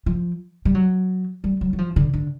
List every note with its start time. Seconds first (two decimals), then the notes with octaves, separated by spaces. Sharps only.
0.06 F3
0.65 G3
0.75 F#3
1.44 G3
1.61 F#3
1.73 F#3
1.78 F3
1.96 D3
2.14 D3